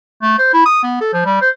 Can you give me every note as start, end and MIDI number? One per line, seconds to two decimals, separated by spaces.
0.22 0.39 57
0.39 0.53 72
0.53 0.61 64
0.66 0.80 87
0.84 1.00 59
1.01 1.09 69
1.13 1.24 53
1.26 1.37 55
1.42 1.50 72